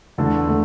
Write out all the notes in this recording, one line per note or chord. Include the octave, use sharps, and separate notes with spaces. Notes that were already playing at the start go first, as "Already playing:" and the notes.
E2 D3 A3 E4 A4
D3 A3